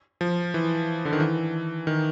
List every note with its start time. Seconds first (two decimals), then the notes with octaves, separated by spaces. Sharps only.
0.21 F3
0.54 E3
1.05 D3
1.13 D#3
1.20 E3
1.87 D#3